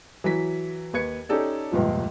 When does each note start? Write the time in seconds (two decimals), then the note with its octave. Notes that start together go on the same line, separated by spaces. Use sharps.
0.24 E3 F#3 B6
0.93 D#2 B4 G#6 C#7
1.29 C#4 D#4 G4 A4 D5
1.72 F1 C#2 G2 A#2 F3